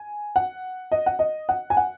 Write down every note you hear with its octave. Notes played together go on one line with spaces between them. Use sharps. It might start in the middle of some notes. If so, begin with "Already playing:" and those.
Already playing: G#5
F#5
D#5
F#5
D#5
F#5
G#5
F#5